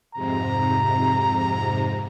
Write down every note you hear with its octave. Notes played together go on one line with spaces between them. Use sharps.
F2 G#2 C3 A#5